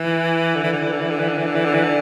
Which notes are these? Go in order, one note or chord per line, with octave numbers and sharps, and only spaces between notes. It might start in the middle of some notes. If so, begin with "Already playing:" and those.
Already playing: E3
D3
E3
D3
E3
D3
E3
D3
E3
D3
E3
D3
E3
D3
E3
D3